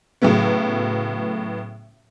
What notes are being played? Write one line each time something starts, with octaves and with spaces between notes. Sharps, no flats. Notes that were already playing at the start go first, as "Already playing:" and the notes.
A2 C#3 F#3 A3 B3